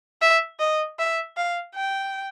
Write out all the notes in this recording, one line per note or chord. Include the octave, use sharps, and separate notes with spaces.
E5
D#5
E5
F5
G5